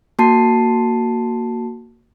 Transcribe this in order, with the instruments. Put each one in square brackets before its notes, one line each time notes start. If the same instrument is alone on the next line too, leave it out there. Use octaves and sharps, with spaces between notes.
[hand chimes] A#3 F#4 A5 C7